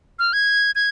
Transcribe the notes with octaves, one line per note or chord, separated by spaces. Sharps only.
F6
G#6
G#6